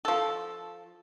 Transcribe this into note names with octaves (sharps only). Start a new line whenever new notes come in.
F3 A4